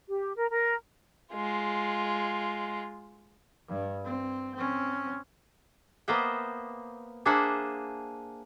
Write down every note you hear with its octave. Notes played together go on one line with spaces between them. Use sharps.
G4
A#4
A#4
G#3 F4
G2
C4
C4 C#4
A#3 B3 C5 D#5 E5 G5
A#3 D4 G#4 C5 E5 F#5